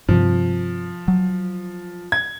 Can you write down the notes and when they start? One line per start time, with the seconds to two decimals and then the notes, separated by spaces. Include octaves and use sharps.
0.08 G2 C3 F3
1.08 F#3
2.12 G#6